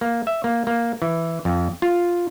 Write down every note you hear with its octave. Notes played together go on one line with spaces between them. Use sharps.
A#3
E5
A#3
A#3
E3
F2
F4